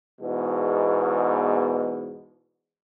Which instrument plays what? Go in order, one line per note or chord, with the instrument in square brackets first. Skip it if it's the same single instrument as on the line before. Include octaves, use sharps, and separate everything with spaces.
[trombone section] E2 G#2 B2